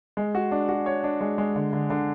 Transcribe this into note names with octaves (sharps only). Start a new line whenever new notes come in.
G#3
F#4
D4
F#4
C#5
D4
G#3
G#3
D3
D3
D3